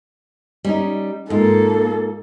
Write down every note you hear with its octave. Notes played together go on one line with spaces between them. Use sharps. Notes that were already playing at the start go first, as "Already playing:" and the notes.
G3 C#4 D#4
G#2 A#3 F4 A4